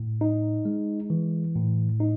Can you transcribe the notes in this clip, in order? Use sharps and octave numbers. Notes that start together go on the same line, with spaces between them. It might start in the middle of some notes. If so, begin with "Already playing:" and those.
Already playing: A2
D#4
G#3
E3
A2
D#4